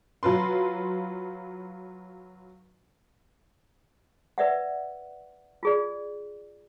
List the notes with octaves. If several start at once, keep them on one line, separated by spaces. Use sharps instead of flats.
F#3 F4 B4 C6
B4 D5 E5 F#5
F4 G#4 D5